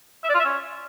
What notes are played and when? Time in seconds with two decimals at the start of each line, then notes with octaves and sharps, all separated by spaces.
0.24 E5
0.29 D5
0.34 F4
0.40 E5
0.45 C#4